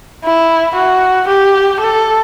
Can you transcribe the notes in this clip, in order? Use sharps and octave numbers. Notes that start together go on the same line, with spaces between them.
E4
F#4
G4
A4